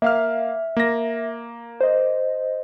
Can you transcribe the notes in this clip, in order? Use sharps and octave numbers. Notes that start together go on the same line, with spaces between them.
A#3 E5 F5 F6
A#3 A#6
C5 D#5